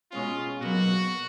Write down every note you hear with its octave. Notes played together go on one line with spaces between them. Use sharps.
B2 G#3 C#4 F4
B2 F#3 A#3 F#4